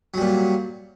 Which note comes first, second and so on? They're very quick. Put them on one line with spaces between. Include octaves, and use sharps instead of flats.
F#3 G3 A#2